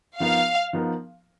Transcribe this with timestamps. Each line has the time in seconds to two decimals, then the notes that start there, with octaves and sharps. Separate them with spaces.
0.20 F3 B3 D#4 A#4 F5
0.73 F3 B3 D#4 A#4